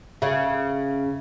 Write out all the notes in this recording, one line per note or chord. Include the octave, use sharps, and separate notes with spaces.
C#3 E5 F5